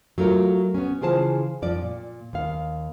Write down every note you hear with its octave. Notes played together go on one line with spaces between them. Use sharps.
F#3 A3 F4 A#4
B3 C#4
C#3 E3 F4 G#4 C5 A5
F2 F3 D5
A#2
D#2 F5